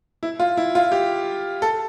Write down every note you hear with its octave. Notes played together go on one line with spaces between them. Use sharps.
E4
F4
E4
F4
G4
A4